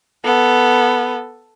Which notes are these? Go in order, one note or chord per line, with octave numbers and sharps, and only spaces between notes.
B3 A4